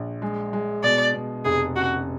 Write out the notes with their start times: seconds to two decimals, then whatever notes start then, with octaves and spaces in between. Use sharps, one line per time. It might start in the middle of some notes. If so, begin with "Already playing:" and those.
Already playing: A#1
0.22 G#3
0.53 G#3
0.83 B2 D5
1.14 B2
1.45 F1 G#4
1.76 C#3 F#4